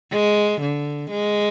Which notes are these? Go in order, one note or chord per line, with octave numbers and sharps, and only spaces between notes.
G#3
D3
G#3